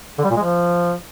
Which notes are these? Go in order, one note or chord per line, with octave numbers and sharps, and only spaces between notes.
D3
G3
A#2
G#3
F3